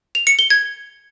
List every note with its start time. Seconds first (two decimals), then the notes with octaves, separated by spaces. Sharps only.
0.15 F7
0.27 C#7
0.39 G7
0.50 G#6